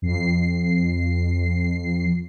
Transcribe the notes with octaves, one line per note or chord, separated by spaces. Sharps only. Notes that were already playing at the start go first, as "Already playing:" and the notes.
F2 C7